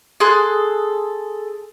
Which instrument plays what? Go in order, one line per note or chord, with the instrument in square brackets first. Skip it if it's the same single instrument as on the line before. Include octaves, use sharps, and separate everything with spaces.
[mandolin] G#4 A4 C6 F#6